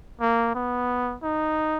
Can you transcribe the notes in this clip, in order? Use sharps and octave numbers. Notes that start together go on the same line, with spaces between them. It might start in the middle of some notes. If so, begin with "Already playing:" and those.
A#3
B3
D#4